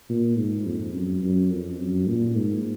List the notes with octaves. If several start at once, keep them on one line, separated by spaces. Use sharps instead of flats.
A#2
G#2
F2
F#2
F#2
F2
F#2
A#2
G#2